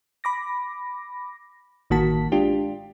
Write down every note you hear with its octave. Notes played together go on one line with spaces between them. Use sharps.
B5 D6 A#6
A1 D#3 A#3 F#4 A5 B6
G#3 D4 F4 G4